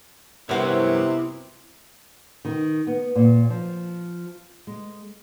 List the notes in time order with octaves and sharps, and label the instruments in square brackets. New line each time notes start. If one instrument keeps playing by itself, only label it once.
[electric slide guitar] G2 A#4 C#5 [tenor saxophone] C3 [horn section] B3 [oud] E4 F#4 C5
[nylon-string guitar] D#3
B3
A#2
F3
G#3